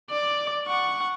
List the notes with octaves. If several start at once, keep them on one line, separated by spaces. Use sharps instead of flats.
D5
F#5 C#6